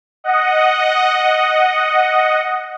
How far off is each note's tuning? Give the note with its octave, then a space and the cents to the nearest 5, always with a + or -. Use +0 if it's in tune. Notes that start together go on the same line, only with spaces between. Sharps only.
D#5 +0 F#5 +0